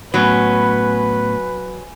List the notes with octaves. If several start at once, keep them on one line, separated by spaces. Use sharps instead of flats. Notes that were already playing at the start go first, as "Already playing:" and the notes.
A2 F#3 B3 C#4 B4 G#5 B5